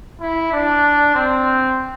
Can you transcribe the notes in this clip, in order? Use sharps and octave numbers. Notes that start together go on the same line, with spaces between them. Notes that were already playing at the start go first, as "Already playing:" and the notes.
E4
D4
C4